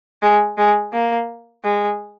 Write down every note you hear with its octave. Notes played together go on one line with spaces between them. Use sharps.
G#3
G#3
A#3
G#3